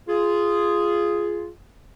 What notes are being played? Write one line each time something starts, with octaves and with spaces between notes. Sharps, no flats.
F4 G#4